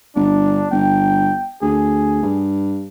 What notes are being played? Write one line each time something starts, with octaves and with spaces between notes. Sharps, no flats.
G1 D4
G1 G5
D2 G#4
G2